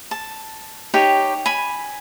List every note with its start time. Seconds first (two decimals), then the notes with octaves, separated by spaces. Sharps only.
0.11 A5
0.94 D#4 G4 C#5 G5
1.46 G#5 B5